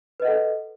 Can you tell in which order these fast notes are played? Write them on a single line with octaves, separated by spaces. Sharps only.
B4 D#5 F#5 A4